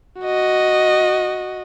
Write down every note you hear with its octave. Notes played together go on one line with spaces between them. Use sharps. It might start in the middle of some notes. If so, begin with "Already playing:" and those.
F#4 D#5